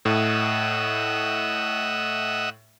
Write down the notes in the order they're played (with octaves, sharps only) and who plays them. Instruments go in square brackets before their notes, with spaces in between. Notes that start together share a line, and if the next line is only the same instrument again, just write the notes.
[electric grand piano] A2 [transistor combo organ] D#5 E5 F#5